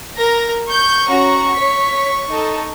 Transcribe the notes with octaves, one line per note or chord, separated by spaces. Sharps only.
A#4 A#5 A#6
C#6 G6
C#4 F#4 A#5
C#5 B6
D#4 A4